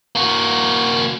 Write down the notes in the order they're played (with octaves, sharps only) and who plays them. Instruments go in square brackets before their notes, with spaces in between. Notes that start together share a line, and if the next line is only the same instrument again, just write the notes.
[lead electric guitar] A#3 F#4